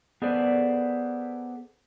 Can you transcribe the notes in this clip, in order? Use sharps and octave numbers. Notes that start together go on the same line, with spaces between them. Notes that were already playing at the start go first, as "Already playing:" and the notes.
B3 G#4 A4 B4 C5 D5